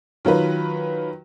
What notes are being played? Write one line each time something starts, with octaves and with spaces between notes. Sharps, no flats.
D#3 F#3 F4 B4